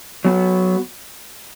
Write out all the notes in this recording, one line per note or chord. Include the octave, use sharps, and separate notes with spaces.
F#3 B3 F#4